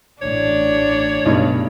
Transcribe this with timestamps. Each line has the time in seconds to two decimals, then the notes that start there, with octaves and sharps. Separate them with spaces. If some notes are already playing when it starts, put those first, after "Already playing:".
0.22 A1 A2 D4 C#5 D5
1.26 B1 G2 C#3 A3 D#4